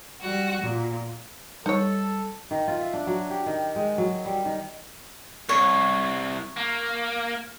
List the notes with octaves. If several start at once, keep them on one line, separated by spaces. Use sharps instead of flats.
G3 F#4 F#6
A#2
G3 D#4 A4 C#5
D#3
F4
E5
D4
F#3
G4
D#3
G#3
F#3
G3
D#3
C2 C#5
A#3